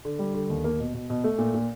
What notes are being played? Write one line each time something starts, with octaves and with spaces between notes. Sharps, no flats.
D3
G3
D3
D#2
A#3
B2
B2
B2
A3
A#2
A#2